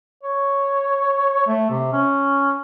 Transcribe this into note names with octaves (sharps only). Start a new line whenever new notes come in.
C#5
A3
C3
C#4